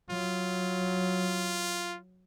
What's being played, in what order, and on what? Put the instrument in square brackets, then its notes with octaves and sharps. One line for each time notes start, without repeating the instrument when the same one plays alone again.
[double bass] F#3 [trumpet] F4